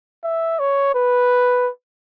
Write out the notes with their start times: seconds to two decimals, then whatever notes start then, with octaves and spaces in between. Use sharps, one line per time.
0.24 E5
0.60 C#5
0.95 B4